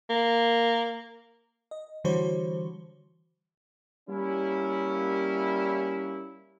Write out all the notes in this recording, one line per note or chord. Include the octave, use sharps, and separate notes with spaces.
A#3
D#5
D3 E3 G3 F#4 C5 C#5
G3 A#3 C#4 E4